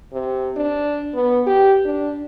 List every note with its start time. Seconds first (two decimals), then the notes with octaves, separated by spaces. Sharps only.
0.13 C3
0.56 D4
1.15 B3
1.46 G4
1.85 D4